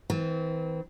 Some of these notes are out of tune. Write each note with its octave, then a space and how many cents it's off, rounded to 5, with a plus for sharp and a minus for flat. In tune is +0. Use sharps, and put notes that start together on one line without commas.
E3 -35 C4 -25